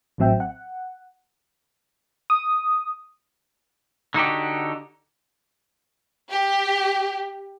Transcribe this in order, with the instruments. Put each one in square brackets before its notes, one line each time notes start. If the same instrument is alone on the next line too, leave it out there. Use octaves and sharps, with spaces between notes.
[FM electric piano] A1 A2 F#3 C4 E5 G5
F#5
D#6
[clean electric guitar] D3 D#4 F#4 G4
[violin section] G4